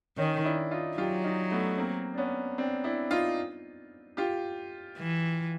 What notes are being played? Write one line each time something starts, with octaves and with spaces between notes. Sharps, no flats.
D#3 C#4 D#4
D4 E4
D#4 F4
F#3 F4 G4
D#4 F4
A3 B3
A#3 C4
D4
B3 C#4
C4 D4
D4 E4
D#4 F4
F4 G4
E3